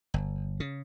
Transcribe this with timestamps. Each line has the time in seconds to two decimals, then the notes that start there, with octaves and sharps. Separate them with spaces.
0.14 G1
0.60 C#3